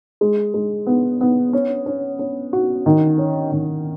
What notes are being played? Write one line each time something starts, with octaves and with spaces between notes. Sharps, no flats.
G#3
G#3
B3
B3
C#4
C#4
C#4
F#4
D#3
C#4
D#3